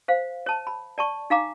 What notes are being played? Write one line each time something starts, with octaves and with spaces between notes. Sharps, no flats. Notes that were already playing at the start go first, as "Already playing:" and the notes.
C5 F5
C#5 A5
B5
D5 A5 C#6
D#4 F5 A#5 D6